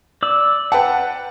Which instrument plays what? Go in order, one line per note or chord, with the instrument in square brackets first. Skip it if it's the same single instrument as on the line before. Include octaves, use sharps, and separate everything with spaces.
[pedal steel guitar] D5 E6
[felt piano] B4 G5 A5 [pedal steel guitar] F#5